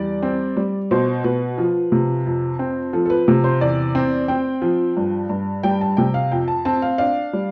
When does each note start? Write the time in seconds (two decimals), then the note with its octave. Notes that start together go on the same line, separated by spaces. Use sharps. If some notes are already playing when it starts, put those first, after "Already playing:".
Already playing: E2 G3 D5
0.23 C4
0.57 G3
0.91 B2 C5
1.24 B2 B4
1.58 F3
1.92 C3
2.26 F2
2.59 C4
2.93 F3 A4
3.06 A4
3.10 B4
3.28 C3
3.44 C5
3.61 E2 D5
3.95 C4
4.28 C4 G5
4.62 F3
4.97 G2
5.29 G2
5.63 G3 G5
5.81 A5
5.97 C3 G5
6.14 F5
6.31 F2 G5
6.48 A5
6.65 C4 A5
6.82 F5
6.98 D4 F5
7.33 G3